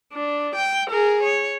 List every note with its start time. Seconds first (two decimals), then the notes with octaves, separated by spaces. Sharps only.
0.13 D4
0.55 G5
0.90 G#4 A#4
1.23 C#5